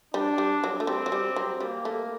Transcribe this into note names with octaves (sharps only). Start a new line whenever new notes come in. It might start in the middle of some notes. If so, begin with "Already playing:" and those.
G3 D4
G3
F#3
A3
G3 C4
F#3
G3
F#3
G3 A#3
A3